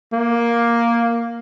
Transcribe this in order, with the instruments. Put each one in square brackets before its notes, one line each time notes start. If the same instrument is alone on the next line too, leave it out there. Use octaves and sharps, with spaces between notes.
[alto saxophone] A#3